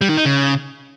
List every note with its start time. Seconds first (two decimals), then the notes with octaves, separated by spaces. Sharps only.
0.01 G3
0.09 D#3
0.17 D#4
0.25 C#3